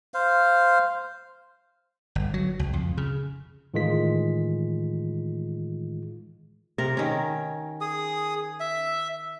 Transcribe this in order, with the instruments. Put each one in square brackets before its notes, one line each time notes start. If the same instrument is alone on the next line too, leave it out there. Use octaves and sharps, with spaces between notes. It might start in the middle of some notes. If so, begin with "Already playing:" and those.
[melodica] C5 F5
[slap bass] G1
F#3
C#2
F2
C#3
[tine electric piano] A2 D#3 E3 G#3 F4 B6
[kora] C3 A#4
D#3 C#4
[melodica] G#4 D#6
E5